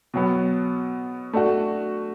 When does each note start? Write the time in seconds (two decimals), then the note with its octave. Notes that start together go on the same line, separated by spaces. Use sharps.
0.14 B2 F#3 B3
1.33 A3 D4 F#4